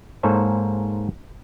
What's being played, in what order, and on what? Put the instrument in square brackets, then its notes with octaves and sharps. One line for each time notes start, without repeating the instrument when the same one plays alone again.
[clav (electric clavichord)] G#2 A#3 A4 C5 C#5 G#5